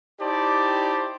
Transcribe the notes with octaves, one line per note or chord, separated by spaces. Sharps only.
D#4 E4 G4 C5 D5 A5